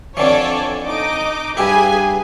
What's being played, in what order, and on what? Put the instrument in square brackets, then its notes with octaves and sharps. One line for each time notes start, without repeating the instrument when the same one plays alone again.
[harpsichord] F2 D3 E3 [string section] A4 C#5 D5
[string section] D#4 D#5 D6
[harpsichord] G2 G4 E5 [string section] G#4 B4 G#5